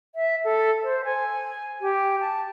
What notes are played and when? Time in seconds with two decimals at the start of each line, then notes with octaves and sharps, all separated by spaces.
0.15 E5
0.44 A4
0.84 C5
1.05 G#5
1.81 G4
2.21 A5